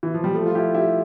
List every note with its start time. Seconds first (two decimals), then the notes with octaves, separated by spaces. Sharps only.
0.03 E3
0.14 F3
0.24 G3
0.34 F3 A3
0.46 F4
0.55 E4 G4
0.74 E4 G4